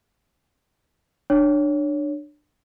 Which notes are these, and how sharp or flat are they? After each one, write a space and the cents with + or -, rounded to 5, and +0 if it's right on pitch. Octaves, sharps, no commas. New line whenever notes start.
D4 +25 C#5 +10